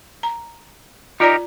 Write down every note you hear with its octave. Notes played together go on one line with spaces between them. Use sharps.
A#5
D#4 F4 G4 A#4 D5 A#5